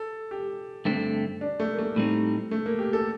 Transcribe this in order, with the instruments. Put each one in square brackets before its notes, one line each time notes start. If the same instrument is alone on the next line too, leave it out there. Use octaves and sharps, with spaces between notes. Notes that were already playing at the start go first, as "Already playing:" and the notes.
Already playing: [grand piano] A4
G4
[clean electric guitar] G2 D3 A3 C4
[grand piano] D4
A3
A#3
A3
[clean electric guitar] A2 G3 C4 D#4
[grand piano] A3
A#3
G4
A4